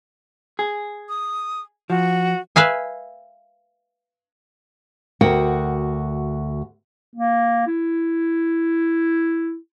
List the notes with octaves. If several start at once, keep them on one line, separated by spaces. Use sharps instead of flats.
G#4
D#6
F3 F#4
B4 E5 F5 G#5
D2 F#4 A#4 F#5 G5
A#3
E4